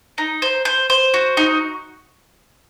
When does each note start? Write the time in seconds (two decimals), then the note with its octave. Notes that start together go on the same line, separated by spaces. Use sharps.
0.18 D#4
0.42 C5
0.65 C5
0.90 C5
1.14 F#4
1.37 D#4